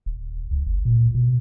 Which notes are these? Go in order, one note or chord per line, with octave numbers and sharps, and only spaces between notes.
D#1
C#2
F#1
A#2
B2